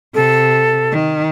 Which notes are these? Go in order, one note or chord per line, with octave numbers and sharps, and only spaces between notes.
C3 A4
D#3